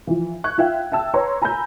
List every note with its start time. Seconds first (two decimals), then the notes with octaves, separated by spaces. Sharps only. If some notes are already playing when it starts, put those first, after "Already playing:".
0.07 E3 F3
0.44 C#6 F#6 G#6
0.58 F4 E5 F5 G5
0.92 E5 G5 A5 E6
1.14 B4 C#5 A#5 C6
1.42 G#5 A#5 B5 E6 G6